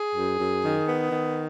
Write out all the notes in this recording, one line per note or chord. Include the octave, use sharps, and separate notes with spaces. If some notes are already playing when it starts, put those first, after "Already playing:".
Already playing: G#4
F#2
F#2
D#3
B3
D#3